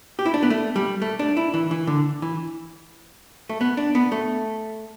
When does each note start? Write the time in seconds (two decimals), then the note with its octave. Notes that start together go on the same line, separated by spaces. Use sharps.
0.19 G4
0.25 E4
0.34 D4
0.43 B3
0.50 A3
0.76 G3
1.02 A3
1.19 D4
1.37 E4
1.54 E3
1.71 E3
1.87 D3
2.22 E3
3.49 A3
3.61 B3
3.77 D4
3.95 B3
4.12 A3